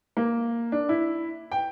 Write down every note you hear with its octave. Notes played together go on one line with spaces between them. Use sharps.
A#3
D4
E4
G5